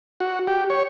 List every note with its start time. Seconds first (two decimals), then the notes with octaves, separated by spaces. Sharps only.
0.20 F#4
0.47 G4
0.70 C#5